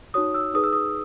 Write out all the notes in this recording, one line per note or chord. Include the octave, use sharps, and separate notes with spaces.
D#4 F#4 C#5 D#6
E6
D#4 G#4 B4 D#6
E6
D#6